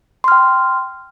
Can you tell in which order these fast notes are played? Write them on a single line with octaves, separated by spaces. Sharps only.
C6 F6 G5